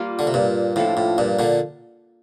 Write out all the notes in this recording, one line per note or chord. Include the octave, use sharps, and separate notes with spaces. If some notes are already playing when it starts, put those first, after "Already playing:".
Already playing: G3 A#3 F4
D3
C3
G2 A#2
A2 F3 A#3 D4 A4
A2
G2 A#2
A#2 D3